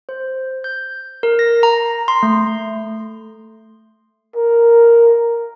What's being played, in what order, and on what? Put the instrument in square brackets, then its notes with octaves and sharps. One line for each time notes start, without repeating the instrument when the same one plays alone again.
[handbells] C5
G6
A#4
A#6
A#5
C6
A3
[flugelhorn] A#4